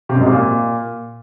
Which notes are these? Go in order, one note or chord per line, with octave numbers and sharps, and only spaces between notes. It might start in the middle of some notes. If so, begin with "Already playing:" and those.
C3
F#2
G#2
C3
A#2